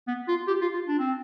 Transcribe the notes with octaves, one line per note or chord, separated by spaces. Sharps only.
B3
F4
G4
F4
F4
D4
C4